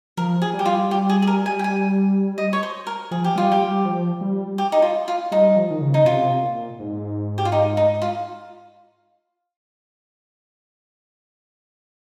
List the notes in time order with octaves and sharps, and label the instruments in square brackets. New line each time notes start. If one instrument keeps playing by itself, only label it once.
[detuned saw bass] F3 [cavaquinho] A#4
[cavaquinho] G#4
[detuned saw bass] G3
[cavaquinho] G4
F4
[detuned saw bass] G3 [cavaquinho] G4
[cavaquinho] G#4
G#4
A#4
G#5
G5
G#5
D#5
C#5
C5
A#4
[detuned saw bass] F3 [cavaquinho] G#4
[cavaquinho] G4
[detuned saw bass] G3 [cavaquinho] F4
[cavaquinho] G4
[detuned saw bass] G3
F3
G3
[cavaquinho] G4
D#4
F4
F4
[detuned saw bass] G3 [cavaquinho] D#4
[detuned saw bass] F3
D#3
C#3
[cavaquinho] D#4
[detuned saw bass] C3 [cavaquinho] F4
[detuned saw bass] A#2
G#2
[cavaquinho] G4
F4
D#4
D#4
F4